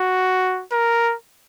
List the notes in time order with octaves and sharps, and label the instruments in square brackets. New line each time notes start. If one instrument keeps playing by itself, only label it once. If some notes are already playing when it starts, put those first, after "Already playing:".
Already playing: [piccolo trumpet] F#4
A#4